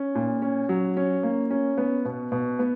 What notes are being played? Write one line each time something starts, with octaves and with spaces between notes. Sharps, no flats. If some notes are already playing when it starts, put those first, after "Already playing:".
Already playing: C#4
A#2
C#4
F#3
C#4
A#3
C#4
B3
B2
B2
B3